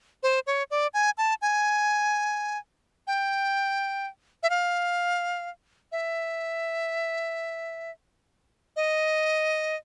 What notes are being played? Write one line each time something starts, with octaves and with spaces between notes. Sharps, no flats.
C5
C#5
D5
G#5
A5
G#5
G5
E5
F5
E5
D#5